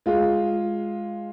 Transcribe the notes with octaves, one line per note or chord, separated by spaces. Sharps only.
G#3 F4